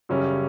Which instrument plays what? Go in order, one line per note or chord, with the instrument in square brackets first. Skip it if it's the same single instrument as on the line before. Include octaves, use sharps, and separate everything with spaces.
[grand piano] F#2 C#3 G3 C#4